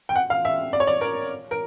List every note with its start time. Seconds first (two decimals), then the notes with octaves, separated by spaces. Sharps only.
0.09 G5
0.16 F#5
0.30 F5
0.45 E5
0.73 D5
0.80 C#5
0.87 D5
1.01 A#4
1.51 A#4